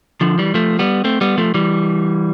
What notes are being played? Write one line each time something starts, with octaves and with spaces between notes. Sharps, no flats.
D3 F3
E3 G3
F3 A3
G3 B3
A3 C4
G3 B3
F3 A3
E3 G3